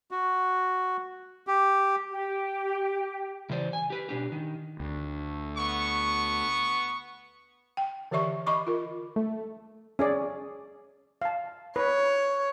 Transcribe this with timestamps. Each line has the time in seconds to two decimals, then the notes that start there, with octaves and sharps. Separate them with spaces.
0.11 F#4
1.47 G4
2.10 G4
3.50 C#3 E3 C5 D5
3.73 G#5
3.90 G4 B4
4.09 B2 D4 G4
4.32 D#3
4.80 D2
5.57 B3 C#6
7.77 G5
8.11 D3 E3 G4 D5 E5 C#6
8.47 D#5 B5 C#6 D6
8.67 F4 A#4
9.16 A3
9.99 C#4 G#4 D5
11.22 F5 A5
11.76 B4 C#5